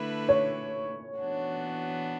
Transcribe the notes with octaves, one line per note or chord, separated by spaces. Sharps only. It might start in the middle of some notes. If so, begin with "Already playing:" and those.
Already playing: D3 A3 E4 B4
C#5
E3 B3 D4 F#4